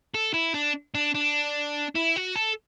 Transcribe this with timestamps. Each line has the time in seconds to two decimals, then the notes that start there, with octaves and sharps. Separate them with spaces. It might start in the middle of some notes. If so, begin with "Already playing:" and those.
0.14 A4
0.34 E4
0.54 D4
0.95 D4
1.15 D4
1.95 E4
2.16 F#4
2.36 A4